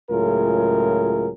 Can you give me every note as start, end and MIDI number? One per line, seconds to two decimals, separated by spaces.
0.10 1.29 37
0.10 1.29 45
0.10 1.29 54
0.10 1.29 65
0.10 1.29 68
0.10 1.29 70